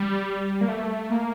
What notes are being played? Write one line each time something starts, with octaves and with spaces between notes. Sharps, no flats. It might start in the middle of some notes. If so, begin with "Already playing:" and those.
Already playing: G3
A#3
A3
A#3